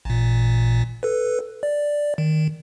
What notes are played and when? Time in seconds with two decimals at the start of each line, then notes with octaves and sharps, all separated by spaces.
0.05 A1 A#2
1.03 A4 B4
1.63 D5
2.18 D#3